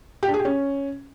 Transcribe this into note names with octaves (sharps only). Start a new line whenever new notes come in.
G4
D4
G#4
G4
C#4